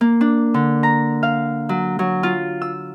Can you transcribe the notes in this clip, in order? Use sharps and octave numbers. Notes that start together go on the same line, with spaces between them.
A#3
D4
D3
A#5
F5
F#3
F#3
F4
E6